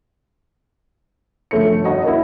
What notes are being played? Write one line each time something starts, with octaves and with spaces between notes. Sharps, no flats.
G1 F3 A3 C#5 C#7
F#4 C#5 D#5 F#5
A#3 E4